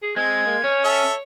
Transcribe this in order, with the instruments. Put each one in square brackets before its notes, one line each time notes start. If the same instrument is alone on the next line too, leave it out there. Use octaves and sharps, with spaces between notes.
[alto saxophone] G#4
[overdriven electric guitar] G#3 [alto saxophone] C4 [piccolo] G#6
[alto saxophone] A#3
[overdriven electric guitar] C#4 [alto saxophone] C#5
[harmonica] A4 E5